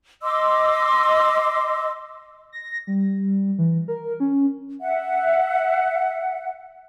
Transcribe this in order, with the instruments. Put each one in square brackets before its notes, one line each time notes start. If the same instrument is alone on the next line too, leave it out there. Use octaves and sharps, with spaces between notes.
[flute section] D#5 C6 D6 E6
[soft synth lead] A#6
G3
E3
A#4
C#4
[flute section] E5 F#5